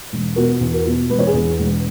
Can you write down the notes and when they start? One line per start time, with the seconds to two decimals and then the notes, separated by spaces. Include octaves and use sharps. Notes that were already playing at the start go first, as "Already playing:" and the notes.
0.12 E1
0.36 B2 F#4 A#4
0.61 E2
0.73 F#4 A#4
0.86 B2
1.10 E1 B4
1.19 C#5
1.26 G#4 B4
1.34 E2
1.59 E1